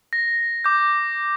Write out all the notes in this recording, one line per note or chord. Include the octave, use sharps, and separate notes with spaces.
A#6
D6 G6